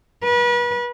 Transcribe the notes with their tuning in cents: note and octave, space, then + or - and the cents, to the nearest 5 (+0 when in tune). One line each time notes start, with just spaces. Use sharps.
B4 -35